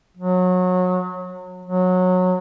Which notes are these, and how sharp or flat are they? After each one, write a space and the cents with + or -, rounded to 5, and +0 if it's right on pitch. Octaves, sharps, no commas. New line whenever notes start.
F#3 -25
F#3 -20